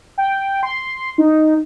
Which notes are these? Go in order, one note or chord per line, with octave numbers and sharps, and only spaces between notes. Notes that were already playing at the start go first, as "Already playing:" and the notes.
G5
C6
D#4